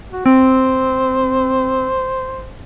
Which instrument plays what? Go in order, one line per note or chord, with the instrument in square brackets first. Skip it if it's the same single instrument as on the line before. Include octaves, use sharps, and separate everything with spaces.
[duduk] F#4
[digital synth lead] C4 [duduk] C5